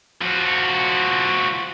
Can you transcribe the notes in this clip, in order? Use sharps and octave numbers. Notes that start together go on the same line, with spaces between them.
F3 F#4